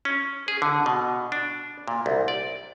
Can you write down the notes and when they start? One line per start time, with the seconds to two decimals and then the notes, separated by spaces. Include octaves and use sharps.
0.05 C#4
0.48 G#4
0.62 D3
0.86 B2
1.32 D4
1.88 A#2
2.06 C2
2.28 D5